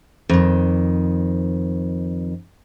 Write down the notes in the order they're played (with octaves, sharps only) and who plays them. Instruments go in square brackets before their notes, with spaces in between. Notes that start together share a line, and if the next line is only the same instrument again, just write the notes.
[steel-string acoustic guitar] F2 D#3